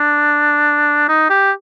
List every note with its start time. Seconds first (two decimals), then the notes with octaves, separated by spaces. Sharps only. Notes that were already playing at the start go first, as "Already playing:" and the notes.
Already playing: D4
1.08 D#4
1.30 G4